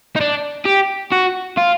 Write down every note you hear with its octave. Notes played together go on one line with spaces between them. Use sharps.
D#4
D4
G4
F#4
F4